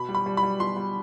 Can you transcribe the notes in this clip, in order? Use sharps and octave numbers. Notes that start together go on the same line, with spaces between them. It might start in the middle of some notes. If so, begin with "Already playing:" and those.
Already playing: B2 B5
G3
B5
G3
B5
G3
B2 C6
G3